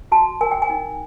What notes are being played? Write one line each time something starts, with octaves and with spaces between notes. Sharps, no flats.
F#4 A5
A#4 G#5
G5
G#5
D#4